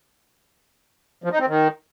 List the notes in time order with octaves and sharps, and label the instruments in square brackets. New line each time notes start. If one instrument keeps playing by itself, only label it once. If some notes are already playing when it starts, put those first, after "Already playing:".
[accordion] F3
D#4
C4
D#3